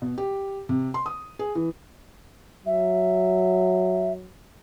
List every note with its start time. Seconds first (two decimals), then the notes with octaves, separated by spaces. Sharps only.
0.02 B2
0.18 G4
0.69 C3
0.94 C6
1.06 D#6
1.39 G#4
1.55 E3
2.66 F#3 E5